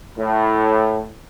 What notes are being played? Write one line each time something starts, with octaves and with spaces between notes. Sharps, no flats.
A2